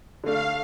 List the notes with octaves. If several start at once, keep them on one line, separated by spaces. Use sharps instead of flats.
D3 A3 D4 F5